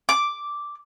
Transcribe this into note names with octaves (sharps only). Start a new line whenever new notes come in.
D6